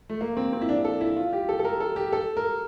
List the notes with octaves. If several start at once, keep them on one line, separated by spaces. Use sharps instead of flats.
A3
A#3
C4
C4
E4
D4
A4
E4
F4
G4
A4
A4
A#4
A4
G4
A4
A#4